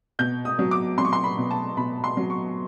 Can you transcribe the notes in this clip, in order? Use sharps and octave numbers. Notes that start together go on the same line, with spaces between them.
B2 G6
D#6
F#3
D6
F#3 C6
C#6
C6
B5
B2
A5
B2 B5
C6
F#3
C#6